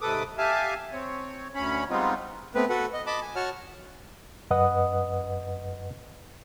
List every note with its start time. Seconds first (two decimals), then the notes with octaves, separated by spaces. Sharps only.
0.01 G#2 C3 A4 B4 D6 D#6
0.38 G4 E5 F5 G#5 A5
0.93 C4 C#5
1.55 D2 C#4 C#5 B5
1.90 G3 G#3 B3 C4 D#4 F4
2.55 A3 B3 C4 B4
2.70 F#4 A4 B4 F#5
2.93 D#5
3.07 D#5 A5 B5 D6
3.22 G#5
3.36 F#4 C#5 F#5 A5 F6
4.51 F#2 B4 D#5 F#5 D#6